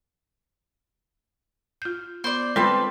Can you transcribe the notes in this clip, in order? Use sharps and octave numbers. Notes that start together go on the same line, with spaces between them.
F4 G6
B3 C5 D5
G3 G#3 C4 F4 A4 B4